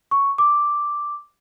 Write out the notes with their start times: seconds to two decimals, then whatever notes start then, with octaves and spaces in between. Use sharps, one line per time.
0.11 C#6
0.38 D6